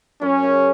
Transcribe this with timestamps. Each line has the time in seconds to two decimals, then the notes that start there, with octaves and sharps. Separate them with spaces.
0.21 F#2 C#4
0.43 C#3